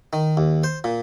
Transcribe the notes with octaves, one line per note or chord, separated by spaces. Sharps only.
D#3
D#2
C5
A#2